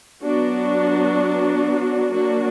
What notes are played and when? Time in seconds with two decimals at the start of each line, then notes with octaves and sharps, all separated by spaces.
0.24 F#3 B3 D4 F#4
2.12 F#3 A#3 D4 F#4